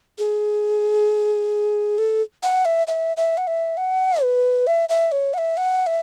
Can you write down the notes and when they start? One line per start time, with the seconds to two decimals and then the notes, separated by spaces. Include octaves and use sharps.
0.18 G#4
1.98 A4
2.43 F#5
2.65 E5
2.87 E5
3.17 E5
3.37 F#5
3.47 E5
3.77 F#5
4.22 B4
4.67 E5
4.89 E5
5.12 C#5
5.34 F#5
5.38 E5
5.57 F#5
5.87 E5